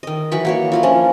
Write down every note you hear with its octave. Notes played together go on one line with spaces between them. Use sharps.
D#3 D#5
E3 F#3 C#5 B5
A#3 F#4 C#5
E4 F4 A#4
F3 C#4 D4